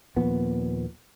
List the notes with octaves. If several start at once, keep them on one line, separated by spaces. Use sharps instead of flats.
D#2 A#2 F3 B3